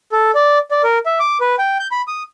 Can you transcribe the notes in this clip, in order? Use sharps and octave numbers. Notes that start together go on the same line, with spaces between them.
A4
D5
D5
A#4
E5
D6
B4
G5
G6
B5
D#6